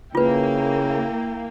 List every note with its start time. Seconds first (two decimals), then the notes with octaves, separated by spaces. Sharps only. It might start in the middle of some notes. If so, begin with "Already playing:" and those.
0.15 C#3 A#3 E4 F4 B4 G5